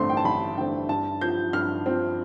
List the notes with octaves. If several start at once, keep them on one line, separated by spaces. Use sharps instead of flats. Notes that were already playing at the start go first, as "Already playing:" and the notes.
Already playing: A1 G2 D3 A3 C4 C6
G5
A5
A1 B5
G2 D3 A3 C4 G5
G2 A5
F3 C4 G6
G2 F6
F3 C4